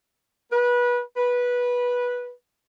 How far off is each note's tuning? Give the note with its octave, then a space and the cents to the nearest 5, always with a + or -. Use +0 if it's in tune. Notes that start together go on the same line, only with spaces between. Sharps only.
B4 -25
B4 -15